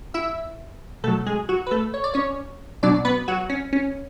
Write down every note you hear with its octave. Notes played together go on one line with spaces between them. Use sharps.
E4 E5
B2 F#3 A3 A4
G#3 G#4
F#3 F#4
B4
A3 A4
C#5
D5
C#4 C#5
B2 F#3 D4 D5
B3 B4
F#3 F#4
C#4
C#4